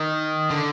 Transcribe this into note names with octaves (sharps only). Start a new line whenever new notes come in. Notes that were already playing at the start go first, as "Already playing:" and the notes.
Already playing: D#3
D3